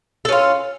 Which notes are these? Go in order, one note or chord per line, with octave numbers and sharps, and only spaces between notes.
C#4 F4 A4